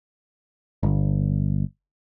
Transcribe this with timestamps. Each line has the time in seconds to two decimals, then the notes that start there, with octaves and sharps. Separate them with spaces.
0.83 G1